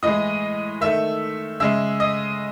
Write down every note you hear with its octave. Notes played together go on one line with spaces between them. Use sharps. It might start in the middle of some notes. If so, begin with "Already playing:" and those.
A2 E3 G#3 D#5 D#6
D#3 A3 E5 E6
C#3 G#3 E5 E6
D#5 D#6